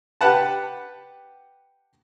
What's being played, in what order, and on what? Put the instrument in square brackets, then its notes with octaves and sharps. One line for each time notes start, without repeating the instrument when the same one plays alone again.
[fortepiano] G4 B4 F#5 A5